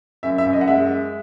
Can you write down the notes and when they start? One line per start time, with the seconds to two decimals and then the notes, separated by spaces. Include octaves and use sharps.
0.23 F#2 E5
0.38 E5
0.46 F#2
0.53 D#5
0.61 F#5
0.68 G#3 E5